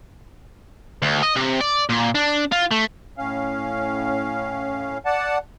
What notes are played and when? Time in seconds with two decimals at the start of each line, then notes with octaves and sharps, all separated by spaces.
1.02 D2
1.23 D#5
1.36 C3
1.61 D5
1.89 A#2
2.15 D4
2.52 F4
2.71 A3
3.18 A2 C#4 F5
5.06 D5 F#5 A5